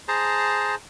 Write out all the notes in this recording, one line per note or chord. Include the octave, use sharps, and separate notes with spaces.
G#4 C5 A5 A#5